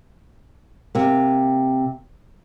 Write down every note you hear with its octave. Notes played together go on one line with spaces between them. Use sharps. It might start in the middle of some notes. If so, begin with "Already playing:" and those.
C3 A#3